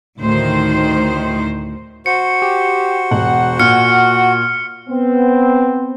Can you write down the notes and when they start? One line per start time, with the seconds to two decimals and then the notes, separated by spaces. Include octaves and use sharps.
0.20 D2 A2 D#3 C5
2.06 F#4 C5 C#7
2.42 G4
3.11 E1 F#5
3.59 A#2 F#4 F6 C#7
4.88 B3 C4